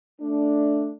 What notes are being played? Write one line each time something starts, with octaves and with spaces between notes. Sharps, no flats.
A3 D4